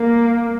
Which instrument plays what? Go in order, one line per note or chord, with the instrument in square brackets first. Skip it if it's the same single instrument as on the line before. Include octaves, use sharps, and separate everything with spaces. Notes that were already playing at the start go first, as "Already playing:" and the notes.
Already playing: [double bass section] A#3